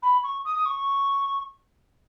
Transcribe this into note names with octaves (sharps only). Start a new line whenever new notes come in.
B5
C#6
D#6
D#6
C#6